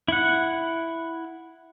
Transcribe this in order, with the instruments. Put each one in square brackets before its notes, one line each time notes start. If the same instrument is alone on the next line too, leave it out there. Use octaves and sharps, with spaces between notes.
[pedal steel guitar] E4 F#5